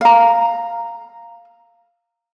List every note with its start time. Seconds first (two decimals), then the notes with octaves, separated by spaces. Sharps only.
0.01 F5 A#5